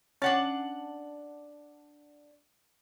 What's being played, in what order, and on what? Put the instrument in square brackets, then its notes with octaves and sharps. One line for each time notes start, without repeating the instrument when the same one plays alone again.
[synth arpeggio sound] C#4 [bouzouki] D4 F#5 A5